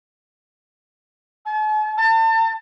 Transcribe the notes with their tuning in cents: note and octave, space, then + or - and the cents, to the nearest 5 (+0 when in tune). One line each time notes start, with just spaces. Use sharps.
A5 -45
A5 +35